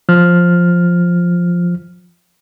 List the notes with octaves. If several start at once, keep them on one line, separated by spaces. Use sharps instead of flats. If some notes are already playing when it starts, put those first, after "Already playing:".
F3 F6